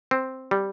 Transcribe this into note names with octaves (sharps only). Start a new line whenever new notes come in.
C4
G3